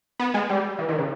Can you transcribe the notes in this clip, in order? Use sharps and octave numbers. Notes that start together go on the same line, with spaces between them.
B3
G#3
G3
E3
D#3
C#3